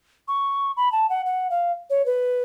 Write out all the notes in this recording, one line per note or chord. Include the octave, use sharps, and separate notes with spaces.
C#6
B5
A5
F#5
F#5
F5
C#5
B4